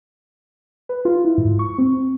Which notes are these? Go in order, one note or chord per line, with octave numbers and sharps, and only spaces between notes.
B4
F4
E4
G#2
C#6
C4